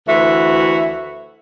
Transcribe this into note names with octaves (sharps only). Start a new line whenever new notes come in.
D2 E3 F#4 E5